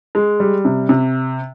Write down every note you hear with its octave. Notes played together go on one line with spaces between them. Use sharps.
G#3
G3
C3
C3